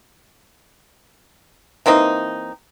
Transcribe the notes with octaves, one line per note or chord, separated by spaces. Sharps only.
E3 A#3 C4 D#4